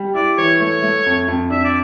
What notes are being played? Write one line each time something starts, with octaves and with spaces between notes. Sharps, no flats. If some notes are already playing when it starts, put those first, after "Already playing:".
Already playing: G3
E4 D5
E3 C#5
A3 C#5
A3
F2
F2
D4 E5
D5